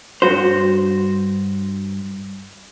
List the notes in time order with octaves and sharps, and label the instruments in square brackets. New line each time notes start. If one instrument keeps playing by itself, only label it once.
[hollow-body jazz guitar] G2 F#4 C5